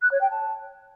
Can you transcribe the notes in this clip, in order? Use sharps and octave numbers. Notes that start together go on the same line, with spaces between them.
F#6
C#5
G5
A5